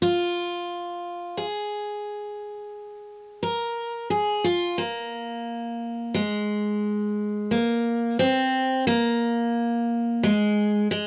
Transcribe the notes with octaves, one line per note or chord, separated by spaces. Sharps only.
F4
G#4
A#4
G#4
F4
A#3
G#3
A#3
C4
A#3
G#3
G#3